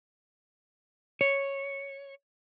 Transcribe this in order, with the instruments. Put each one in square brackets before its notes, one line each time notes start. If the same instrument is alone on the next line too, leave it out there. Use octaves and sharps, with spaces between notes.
[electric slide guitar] C#5